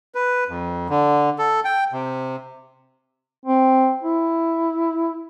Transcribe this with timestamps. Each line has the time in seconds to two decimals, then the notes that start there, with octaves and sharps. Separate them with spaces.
0.15 B4
0.49 F2
0.90 D3
1.38 A4
1.65 G5
1.92 C3
3.46 C4
4.03 E4